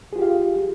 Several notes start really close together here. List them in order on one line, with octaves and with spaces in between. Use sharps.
G#4 F4 G4 F5